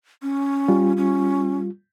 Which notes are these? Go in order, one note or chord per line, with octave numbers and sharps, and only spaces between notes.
C#4
G3 F4
C#4